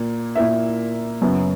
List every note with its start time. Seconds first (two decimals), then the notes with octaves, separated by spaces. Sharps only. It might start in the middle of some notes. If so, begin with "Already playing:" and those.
Already playing: A#2 A#3
0.35 A#2 A#3 E4 A#4 E5
1.22 F#2 C#3 F#3 B3